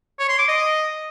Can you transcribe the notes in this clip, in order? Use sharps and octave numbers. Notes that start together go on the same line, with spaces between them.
C#5
C6
D6
D#5